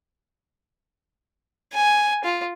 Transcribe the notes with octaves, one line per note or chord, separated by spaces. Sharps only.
G#5
F4